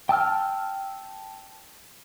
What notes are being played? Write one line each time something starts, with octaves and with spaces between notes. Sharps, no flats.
G5 A5 E6 F6